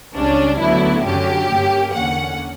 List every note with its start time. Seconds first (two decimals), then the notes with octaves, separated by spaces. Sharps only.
0.15 C#2 C#3 G3 C#4 D4
0.60 D2 D3 F#3 B3 E4
1.05 F#2 D3 F#3 C#4 G4
1.49 G2 D3 A#3 C#4
1.94 E2 D3 A#3 C#4 F#5